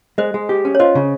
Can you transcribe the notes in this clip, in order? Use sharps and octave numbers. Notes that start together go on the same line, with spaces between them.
G#3 C5 D#5
G#3
G4
C#4
C#5
F4 C5 D#5
C#3